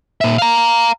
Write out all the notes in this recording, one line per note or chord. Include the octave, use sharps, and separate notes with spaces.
A#2 E5
F5 A#5